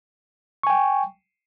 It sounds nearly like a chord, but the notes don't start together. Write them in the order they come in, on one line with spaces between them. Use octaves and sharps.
C#6 G#5 G5